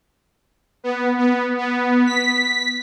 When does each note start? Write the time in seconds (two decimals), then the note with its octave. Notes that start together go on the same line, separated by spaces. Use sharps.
0.84 B3
1.18 B3
1.58 B3
2.06 B6